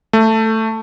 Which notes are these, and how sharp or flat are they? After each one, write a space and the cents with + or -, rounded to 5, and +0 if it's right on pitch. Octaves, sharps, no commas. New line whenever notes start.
A3 +10